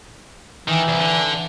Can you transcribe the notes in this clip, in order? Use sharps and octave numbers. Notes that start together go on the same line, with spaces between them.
D#3 E3
C2
D3